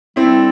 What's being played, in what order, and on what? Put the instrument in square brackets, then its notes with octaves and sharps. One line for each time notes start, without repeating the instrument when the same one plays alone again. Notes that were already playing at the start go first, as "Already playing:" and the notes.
[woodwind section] G3 D4 A4 [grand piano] C4 E4